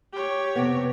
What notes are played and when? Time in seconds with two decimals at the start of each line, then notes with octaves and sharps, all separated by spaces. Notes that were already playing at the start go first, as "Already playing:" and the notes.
0.13 G4 C#5
0.55 F2 C3 B3